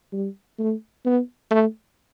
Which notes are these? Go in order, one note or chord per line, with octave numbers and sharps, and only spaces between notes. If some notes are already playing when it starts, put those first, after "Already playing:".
G3
A3
B3
A3